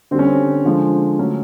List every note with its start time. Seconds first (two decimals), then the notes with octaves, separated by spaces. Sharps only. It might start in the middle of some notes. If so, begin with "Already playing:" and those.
0.11 D3 C4
0.14 G3 C#4
0.26 C4
0.65 D3 F3 G#3
1.19 D3 F#3 A3 C#4